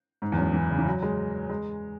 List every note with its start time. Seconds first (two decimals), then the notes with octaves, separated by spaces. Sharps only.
0.22 G#2
0.32 E2
0.38 F#2
0.54 E3
0.70 C#3
0.78 E3
0.86 F#3
1.02 G#3
1.49 G#3